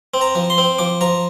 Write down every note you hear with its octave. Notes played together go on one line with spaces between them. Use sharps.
C4
A#5
F3
C6
C4
F3 D6
F3 A#5